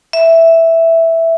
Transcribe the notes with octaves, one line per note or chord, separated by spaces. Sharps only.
E5